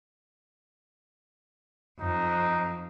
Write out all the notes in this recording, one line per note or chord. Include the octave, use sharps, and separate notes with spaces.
F2 D#4